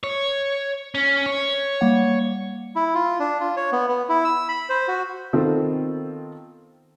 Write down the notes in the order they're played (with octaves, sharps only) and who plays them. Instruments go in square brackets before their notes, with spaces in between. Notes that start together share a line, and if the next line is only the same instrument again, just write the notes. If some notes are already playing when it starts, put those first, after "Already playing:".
[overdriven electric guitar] C#5
C#4
C#5
[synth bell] G3 A#3 F#5
[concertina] E4
F4
D4
F4
C#5
B3
B3
E4
E6
B5
C5
F#4
[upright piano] D#3 B3 C4 F4 A4